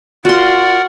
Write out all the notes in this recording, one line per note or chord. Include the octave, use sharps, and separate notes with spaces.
F4 F#4 A#4 D5 F#5 C6